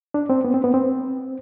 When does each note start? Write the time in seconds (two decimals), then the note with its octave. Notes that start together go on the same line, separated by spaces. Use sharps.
0.14 D4
0.30 C4
0.44 B3
0.54 C4
0.64 B3
0.74 C4